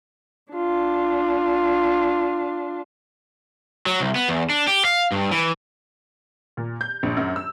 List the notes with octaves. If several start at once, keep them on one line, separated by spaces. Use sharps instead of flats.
D4 F4
F#3
C2
B3
E2
D4
G4
F5
G2
E3
A#2
G6
A#1
F#2
E6